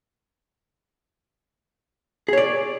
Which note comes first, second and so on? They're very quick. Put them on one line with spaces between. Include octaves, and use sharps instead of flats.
G#4 C#5 D5